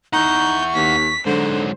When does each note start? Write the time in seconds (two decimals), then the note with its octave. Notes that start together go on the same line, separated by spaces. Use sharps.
0.13 D#4 E4 F#5 C#6 G6
0.75 D#2 B6
1.26 G#2 D3 F#3 C5